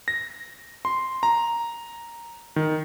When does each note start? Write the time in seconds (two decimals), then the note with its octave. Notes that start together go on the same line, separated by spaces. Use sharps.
0.08 A#6
0.85 C6
1.23 A#5
2.56 D#3